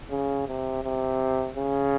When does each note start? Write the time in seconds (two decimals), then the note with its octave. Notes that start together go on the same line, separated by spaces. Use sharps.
0.10 C#3
0.48 C3
0.84 C3
1.57 C#3